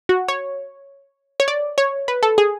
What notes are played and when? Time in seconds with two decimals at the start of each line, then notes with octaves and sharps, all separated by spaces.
0.09 F#4
0.28 C#5
1.40 C#5
1.48 D5
1.78 C#5
2.08 B4
2.23 A4
2.38 G#4